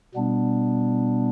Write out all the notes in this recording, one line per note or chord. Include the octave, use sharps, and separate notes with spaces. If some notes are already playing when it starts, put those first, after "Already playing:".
B2 G3 B3 D4